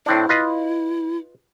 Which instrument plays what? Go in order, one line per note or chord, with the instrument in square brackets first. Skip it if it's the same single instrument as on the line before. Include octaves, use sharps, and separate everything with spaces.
[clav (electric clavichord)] A2 C4 D4 [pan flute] E4
[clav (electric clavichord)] F4 B4 D#5